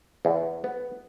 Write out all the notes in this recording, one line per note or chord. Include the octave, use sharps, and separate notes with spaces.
E2
B3